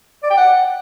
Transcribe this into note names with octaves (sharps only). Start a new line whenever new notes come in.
D5
G5
F#5